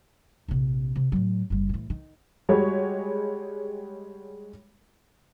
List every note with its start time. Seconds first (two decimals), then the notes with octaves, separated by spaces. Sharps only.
0.48 A#1 C3
0.96 C3
1.12 A2 F#3
1.50 F#1 G3
1.69 A2 E3
1.90 D#3
2.49 G3 G#3 F#4 C#5